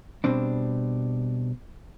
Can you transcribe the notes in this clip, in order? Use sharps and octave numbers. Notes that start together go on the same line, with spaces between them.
B2 G3 C4 D4